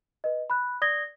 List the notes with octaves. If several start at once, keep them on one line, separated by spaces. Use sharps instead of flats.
B4 D#5
B5 F#6
D5 D#6 G#6 A#6 G7